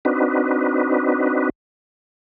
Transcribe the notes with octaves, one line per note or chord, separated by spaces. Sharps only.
C4 D4 D#4 F#4 B4